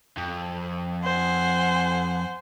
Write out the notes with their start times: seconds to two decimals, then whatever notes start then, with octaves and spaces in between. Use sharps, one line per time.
0.17 F2
1.03 C5 F#5 G#5